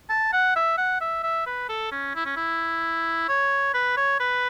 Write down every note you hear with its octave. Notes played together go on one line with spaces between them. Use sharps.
A5
F#5
E5
F#5
E5
E5
B4
A4
C#4
E4
C#4
E4
C#5
B4
C#5
B4